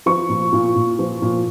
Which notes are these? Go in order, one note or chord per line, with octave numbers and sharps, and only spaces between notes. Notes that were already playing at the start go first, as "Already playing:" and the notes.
F3 C#6
A#2
A#2
A#2
F3
A#2